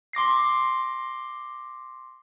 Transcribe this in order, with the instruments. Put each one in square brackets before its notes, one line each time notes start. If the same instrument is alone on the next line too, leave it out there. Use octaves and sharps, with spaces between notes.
[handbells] C6 D6 A#6 C7